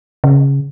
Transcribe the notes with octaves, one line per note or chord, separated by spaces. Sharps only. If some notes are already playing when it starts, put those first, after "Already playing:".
C#3